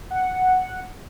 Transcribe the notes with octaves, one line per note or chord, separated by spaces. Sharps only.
F#5